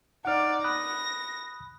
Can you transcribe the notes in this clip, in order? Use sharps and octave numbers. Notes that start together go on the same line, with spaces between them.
D#4 D5 F#5 F6
B5 D#6 F#6 A#6